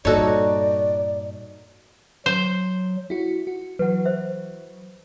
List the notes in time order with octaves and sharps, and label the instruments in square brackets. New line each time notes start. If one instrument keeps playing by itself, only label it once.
[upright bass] G2 A#2 [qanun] D#4 F#4 [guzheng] A4 C#5 [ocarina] D5
[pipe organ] F#3 [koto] C5
[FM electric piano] E4 F#4
F#4
[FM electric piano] E3 F#3 [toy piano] B4 F#5
[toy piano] C5 E5